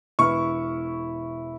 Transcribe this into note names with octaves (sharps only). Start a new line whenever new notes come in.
E1 E4 B4 C#6 F6